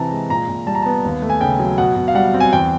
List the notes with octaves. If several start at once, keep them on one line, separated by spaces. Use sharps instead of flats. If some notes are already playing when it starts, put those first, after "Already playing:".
Already playing: C3 E3 C4 A5 A#5
G#3
A#2 A#5
A#2
G3 A5
A#5
B3 A5
D#2
A3
G#5
C#3 G5
F#3
B2 F#5
B2
F5
G3 F#5
C4
G#5
E2 G5